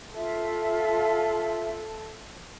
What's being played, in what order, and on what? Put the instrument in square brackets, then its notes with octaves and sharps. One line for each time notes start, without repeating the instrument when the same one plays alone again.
[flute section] F4 E5 [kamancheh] A4